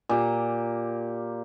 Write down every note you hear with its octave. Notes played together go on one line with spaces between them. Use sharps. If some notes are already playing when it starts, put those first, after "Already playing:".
A#2 G4 A#5